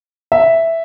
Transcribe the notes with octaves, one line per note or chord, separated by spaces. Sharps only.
E5